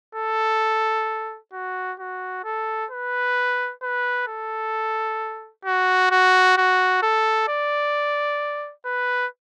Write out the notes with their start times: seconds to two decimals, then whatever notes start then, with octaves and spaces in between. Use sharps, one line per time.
0.15 A4
1.53 F#4
1.99 F#4
2.44 A4
2.91 B4
3.82 B4
4.28 A4
5.65 F#4
6.11 F#4
6.57 F#4
7.02 A4
7.49 D5
8.86 B4